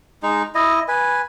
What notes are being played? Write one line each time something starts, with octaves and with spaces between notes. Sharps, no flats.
G#3 D#4
E4 D#5
B4 G#5